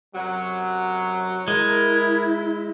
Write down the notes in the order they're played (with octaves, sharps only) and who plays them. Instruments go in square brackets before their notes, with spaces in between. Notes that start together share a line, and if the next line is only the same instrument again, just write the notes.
[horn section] F#2 C3 F#3
[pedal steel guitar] G#3 [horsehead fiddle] E4 [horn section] A#4 [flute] G#6